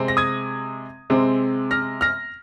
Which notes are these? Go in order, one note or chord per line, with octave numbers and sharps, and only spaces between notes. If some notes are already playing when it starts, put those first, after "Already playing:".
Already playing: C3 G#3 C4
A#6
D#6 G#6
C3 G#3 C4
F6 A#6
F6 A#6